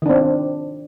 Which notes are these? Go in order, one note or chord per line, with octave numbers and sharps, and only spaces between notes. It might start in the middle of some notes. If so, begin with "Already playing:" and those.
D#3 C4 D4